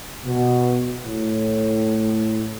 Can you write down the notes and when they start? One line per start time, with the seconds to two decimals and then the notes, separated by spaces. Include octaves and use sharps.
0.24 B2
1.05 A2